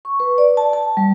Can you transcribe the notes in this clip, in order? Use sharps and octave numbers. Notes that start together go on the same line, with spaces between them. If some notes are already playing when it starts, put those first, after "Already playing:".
C#6
B4
D5
A5
A5
G3